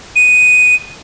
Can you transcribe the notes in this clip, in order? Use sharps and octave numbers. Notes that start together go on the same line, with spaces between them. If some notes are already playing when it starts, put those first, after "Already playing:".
D#7